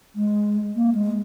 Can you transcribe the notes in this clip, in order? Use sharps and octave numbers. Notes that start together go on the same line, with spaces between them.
G#3
A#3
G#3